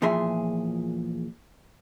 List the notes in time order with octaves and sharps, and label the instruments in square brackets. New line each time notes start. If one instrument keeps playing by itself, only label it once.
[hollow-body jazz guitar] E2 A#2 F3 G#4 E5 C6